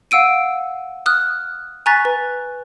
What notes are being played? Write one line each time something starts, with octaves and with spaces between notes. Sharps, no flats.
F5 F#5 E6 D7 D#7
D#6 F6 F#6
G#5 A#5 C#6 F#6 A6 B6
B4